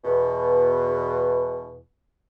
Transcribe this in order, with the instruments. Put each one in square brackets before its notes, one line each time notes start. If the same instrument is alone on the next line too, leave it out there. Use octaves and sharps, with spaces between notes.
[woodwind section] E2 B2